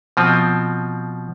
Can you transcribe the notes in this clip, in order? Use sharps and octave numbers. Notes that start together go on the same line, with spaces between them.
B2 F3 C4